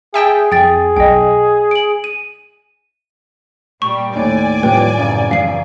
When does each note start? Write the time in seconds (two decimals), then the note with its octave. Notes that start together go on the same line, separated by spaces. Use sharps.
0.14 G#4 E5 G5 A5
0.52 F2 G#4 G5 A6
0.97 B1 D#5 G5
1.71 D7 F#7
2.04 D#7
3.82 A#2 G3 C#6
4.16 D#2 A2 D5 G#5
4.63 D#2 A2 F3 G3 B4 G5
4.98 G#1 F#2 C#3
5.31 E3 F5 C7